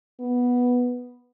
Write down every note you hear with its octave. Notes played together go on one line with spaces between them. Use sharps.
B3